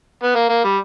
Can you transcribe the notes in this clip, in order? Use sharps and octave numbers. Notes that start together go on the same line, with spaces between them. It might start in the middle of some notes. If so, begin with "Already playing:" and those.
B3
A#3
A#3
G3